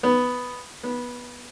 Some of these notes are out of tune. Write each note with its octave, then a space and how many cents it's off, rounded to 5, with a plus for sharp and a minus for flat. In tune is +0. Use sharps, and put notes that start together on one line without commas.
B3 +5
B3 -15